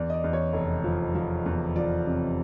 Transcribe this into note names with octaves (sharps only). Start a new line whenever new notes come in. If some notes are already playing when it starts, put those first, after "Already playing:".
Already playing: E2 D5
D#5
D5
E2
C#5
F1
F3
F3
E2
F3 D5
C3